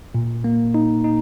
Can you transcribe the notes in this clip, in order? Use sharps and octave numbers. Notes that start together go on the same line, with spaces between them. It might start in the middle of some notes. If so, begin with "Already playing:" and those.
A#2
A#3
D#4
D#4